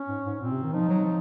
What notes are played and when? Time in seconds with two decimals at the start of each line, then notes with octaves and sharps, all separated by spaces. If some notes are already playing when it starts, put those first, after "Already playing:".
Already playing: C#4
0.08 G#2
0.25 G#2
0.40 A#2 C4
0.51 C3
0.62 D#3
0.73 F3 D#4
0.89 F#3
1.04 F3